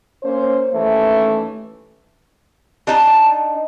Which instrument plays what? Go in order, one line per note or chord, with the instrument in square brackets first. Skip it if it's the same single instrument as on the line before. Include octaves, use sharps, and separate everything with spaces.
[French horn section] A#3 C#4 C5
D#2 E3 A3 C#4
[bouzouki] D4 D#4 A5 A#5